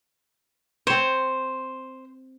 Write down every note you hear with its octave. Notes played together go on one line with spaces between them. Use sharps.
C4 C5 C#5